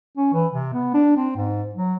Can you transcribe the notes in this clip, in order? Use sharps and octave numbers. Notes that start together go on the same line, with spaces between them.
C#4
E3
C3
B3
D4
C4
G#2
F#3